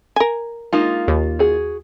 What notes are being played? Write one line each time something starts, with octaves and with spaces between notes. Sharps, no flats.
A#4 G#5
G#3 A#3 D#4 F4
D#2
F#4 G#4